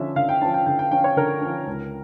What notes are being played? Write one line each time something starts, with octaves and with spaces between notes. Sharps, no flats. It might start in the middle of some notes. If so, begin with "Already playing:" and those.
Already playing: D3 F3 C#4 E5
D3 F5
G5
F3 C#4 A5
G5
D3 G5
G5
F3 C#4 G5
C#5
D3 A#4
F3 C#4
C#2